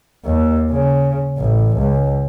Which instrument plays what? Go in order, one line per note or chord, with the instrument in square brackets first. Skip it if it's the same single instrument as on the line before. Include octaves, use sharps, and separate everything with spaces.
[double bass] D#2
C#3
A1
C#2